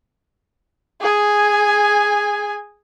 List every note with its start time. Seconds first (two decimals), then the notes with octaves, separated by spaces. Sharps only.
1.01 G#4 G#5